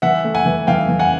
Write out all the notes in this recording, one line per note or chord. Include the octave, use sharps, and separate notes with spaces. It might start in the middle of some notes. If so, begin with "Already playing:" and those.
E3 E5 F#5
A3
F#5 G#5
E3
E3 F5 G5
E3
F#5 G#5